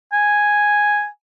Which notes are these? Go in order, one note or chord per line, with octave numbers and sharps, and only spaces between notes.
G#5